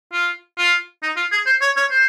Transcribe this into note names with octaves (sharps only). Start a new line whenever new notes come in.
F4
F4
D#4
F4
G#4
C5
C#5
C#5
C5